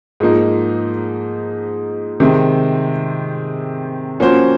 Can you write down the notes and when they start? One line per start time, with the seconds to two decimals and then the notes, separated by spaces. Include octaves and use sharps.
0.20 G#2 F3 A#3 D#4
2.20 C3 D#3 G#3 C4
4.20 F3 A#3 C#4 F#4 C5